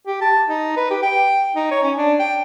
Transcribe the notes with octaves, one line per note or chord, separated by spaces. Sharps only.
G4
A5
D#4
B4
G4
G5
D#4
C#5
C#4
D4
G5